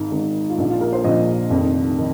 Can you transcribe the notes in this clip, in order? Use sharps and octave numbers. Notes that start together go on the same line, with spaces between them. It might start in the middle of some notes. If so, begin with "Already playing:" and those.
Already playing: G#1 G#2 D#3
G#1 G#2 D#3
F4
A#1 A#2 F3 D#4
F4
A#4
C5
A#1 A#2 F3 D#5
F1 F2 D#3
D#3